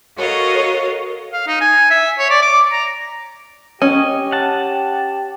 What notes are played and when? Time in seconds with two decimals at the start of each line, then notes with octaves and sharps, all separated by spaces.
0.16 F#4 A4 A#4 C#5 D#5 F5
1.33 F5
1.47 D#4
1.61 G#5
1.90 E5
2.19 C#5
2.30 D5
2.42 D6
2.72 A#5
3.82 C#4 G4 D#5
4.32 F#5 A5